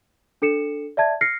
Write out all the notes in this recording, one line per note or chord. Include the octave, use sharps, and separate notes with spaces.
D4 A4 C#7 E7
D5 E5 A5 G#6
F6 A#6 C7 C#7